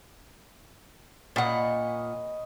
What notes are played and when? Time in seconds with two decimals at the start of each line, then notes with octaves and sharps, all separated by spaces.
1.36 A#2 C#5 D#5 F#5 B5